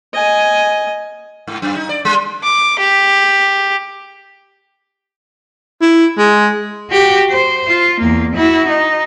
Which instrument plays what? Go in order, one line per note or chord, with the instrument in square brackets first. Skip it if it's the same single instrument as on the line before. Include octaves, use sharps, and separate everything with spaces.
[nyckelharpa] D#5 G#5
[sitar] G#2
F#2
D#4
D5
G3
[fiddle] D6
G4
[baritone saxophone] E4
G#3
[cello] F#4 G4
C5
F4
E2 A#3
E4 F#4
D#4